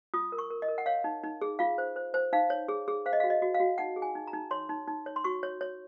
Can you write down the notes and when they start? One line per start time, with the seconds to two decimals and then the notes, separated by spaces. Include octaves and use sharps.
0.14 F4 D#6
0.32 A#4
0.38 C#6
0.50 A#4
0.62 D#5
0.68 A#4
0.78 F#5
0.86 C#5 F5
1.04 D#4
1.24 D#4
1.41 G#4
1.59 F4 F5
1.78 C5
1.96 C5
2.14 C5
2.33 D#4 F5
2.50 C#5
2.68 G#4
2.88 G#4
3.06 C5 F5
3.13 D#5
3.20 F5
3.24 F#4
3.30 D#5
3.42 F#4
3.54 F5
3.60 F#4
3.78 D#4 F#5
3.96 G#4
4.02 G#5
4.15 D#4
4.27 A#5
4.33 D#4
4.51 C#5 C6
4.69 D#4
4.88 D#4
5.06 C#5
5.16 C6
5.24 F#4 C#6
5.43 C#5
5.61 C#5